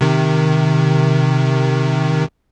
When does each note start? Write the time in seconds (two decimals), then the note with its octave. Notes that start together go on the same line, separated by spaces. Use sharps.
0.01 C3 D#3